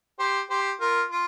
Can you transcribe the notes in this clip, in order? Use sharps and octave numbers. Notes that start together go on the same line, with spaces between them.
G4 C5
G4 C5
F4 A#4
F4